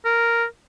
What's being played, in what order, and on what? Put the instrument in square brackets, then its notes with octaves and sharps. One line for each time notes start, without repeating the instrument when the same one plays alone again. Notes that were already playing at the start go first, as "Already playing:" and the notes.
[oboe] A#4